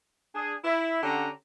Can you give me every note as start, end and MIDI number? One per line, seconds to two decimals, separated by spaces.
0.35 0.55 62
0.35 0.55 68
0.64 1.03 64
1.03 1.29 50
1.03 1.29 61
1.03 1.29 67
1.03 1.29 78
1.03 1.29 82